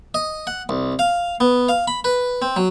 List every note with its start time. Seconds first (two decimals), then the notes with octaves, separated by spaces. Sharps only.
0.14 D#5
0.47 F#5
0.69 C2
0.99 F5
1.40 B3
1.69 F5
1.88 B5
2.04 B4
2.42 C4
2.56 F#3